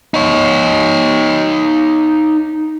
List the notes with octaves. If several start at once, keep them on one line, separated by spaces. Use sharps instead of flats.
D#4 C#5